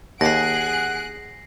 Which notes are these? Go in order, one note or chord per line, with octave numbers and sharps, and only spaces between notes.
D#2 G#4 F#5 F#6 A#6 C7 D7